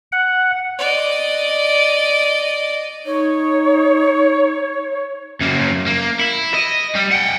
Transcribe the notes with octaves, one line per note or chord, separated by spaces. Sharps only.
F#5
D5 D#5
D#4 C#5
F#2 A#3
A#3
E4
D#5
G3
F#5 G5